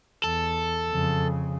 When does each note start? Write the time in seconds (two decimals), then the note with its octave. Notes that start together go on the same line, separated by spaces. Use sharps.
0.24 E2 A4
0.90 F2 C#3